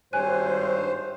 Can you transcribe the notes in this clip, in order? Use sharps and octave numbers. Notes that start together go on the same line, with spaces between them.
G#1 G2 C5 C#5 G#5 F#6 D#7